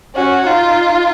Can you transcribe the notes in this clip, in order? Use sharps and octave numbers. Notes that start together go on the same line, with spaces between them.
C#4 F#4
D#4 F4